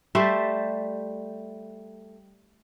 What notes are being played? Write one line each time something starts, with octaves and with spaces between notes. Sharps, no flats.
G3 A3 C5 E5